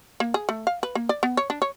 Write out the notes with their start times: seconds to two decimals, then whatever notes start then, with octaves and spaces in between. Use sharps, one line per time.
0.20 A#3
0.34 G#4
0.49 A3
0.67 F5
0.83 B4
0.95 A#3
1.09 D5
1.23 B3
1.37 C#5
1.50 D4
1.62 C#5